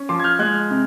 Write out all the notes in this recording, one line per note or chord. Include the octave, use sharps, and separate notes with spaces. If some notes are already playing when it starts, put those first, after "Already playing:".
Already playing: C#4
F3 C6 D6
G#6
F6 G6
G#3 F#6 G#6
C3